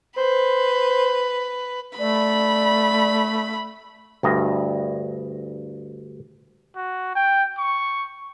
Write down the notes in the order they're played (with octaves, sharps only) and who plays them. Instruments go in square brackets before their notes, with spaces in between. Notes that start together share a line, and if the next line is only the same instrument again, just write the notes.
[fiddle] B4 [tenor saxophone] C5
[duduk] A3 [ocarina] D5 [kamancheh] B5
[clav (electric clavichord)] D2 G2 D#5
[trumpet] F#4
G5
C#6